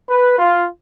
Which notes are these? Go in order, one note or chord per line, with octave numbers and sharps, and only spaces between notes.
B4
F4